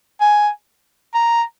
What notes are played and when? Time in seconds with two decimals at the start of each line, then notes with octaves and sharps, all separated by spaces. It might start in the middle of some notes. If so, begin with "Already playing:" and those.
0.21 G#5
1.14 A#5